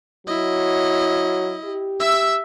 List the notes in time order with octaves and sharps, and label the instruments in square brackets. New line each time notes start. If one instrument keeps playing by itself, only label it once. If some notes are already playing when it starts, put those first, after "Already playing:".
[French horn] F#3 [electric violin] E4 D#5
[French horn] G4
[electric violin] E5 E6